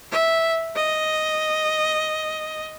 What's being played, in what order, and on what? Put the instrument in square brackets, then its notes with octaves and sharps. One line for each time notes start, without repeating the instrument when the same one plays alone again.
[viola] E5
D#5